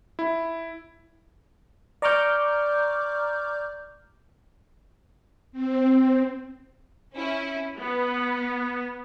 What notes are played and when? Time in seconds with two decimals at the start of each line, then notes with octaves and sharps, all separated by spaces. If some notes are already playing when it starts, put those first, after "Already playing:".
0.19 E4
2.02 D5 A#5 C#6 D6 F6 G6
5.52 C4
7.13 C#4 E4
7.78 B3